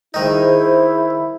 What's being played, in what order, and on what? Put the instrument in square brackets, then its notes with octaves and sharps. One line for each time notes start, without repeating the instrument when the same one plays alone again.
[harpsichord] D#3 D#4 [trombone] E4 [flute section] G#4 C5